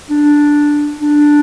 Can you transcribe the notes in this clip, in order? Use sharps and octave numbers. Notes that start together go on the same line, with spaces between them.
D4
D4